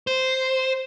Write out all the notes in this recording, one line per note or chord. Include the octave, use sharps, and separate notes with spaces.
C5